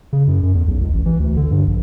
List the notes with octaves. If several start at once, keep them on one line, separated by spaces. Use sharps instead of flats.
C#3
F#2
F#2
E2
B1
C#2
A1
E3
D2
D3
G2
A#1